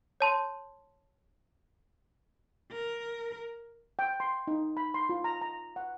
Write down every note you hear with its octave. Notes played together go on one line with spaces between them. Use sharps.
C#5 A5 C6
A#4
G5
C6
D#4
B5
C6
F4
A#5
A#5
F#5